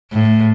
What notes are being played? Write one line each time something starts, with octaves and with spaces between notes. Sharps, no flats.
A2